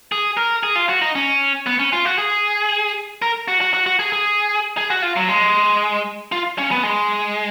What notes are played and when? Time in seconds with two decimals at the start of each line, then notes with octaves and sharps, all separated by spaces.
0.12 G#4
0.37 A#4
0.63 G#4
0.76 F4
0.89 F#4
1.01 D#4
1.15 C#4
1.66 B3
1.79 C#4
1.93 F4
2.05 F#4
2.18 G#4
3.22 A#4
3.48 F#4
3.61 F#4
3.74 F#4
3.86 F#4
3.99 G#4
4.12 G#4
4.77 G#4
4.90 F#4
5.02 F4
5.16 F#3
5.28 G#3
6.32 F4
6.58 C#4
6.71 B3
6.83 G#3